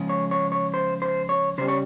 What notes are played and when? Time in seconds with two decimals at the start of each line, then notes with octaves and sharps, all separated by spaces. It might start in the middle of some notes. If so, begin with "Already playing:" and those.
Already playing: C#3 F3 G#3
0.09 C#5
0.31 C#5
0.52 C#5
0.74 C5
1.02 C5
1.29 C#5
1.58 C#3 G3 C5
1.68 C#5